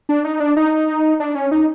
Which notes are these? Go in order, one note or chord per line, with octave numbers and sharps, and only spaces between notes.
D4
D#4
D4
D#4
D4
C#4
D#4